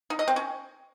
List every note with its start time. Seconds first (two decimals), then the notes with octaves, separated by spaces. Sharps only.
0.10 D#4
0.19 D#5
0.28 C4
0.36 C#4